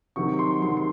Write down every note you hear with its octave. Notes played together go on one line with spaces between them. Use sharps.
C3 D#3 F#3 C#6
C6
C3 D#3 F#3 C6
C6